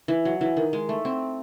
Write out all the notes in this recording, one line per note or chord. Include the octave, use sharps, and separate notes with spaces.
E3
F#3
E3
D#3
G#3
A3
C4